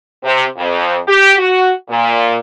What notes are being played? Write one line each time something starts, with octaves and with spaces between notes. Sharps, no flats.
C3
F2
G4
F#4
A#2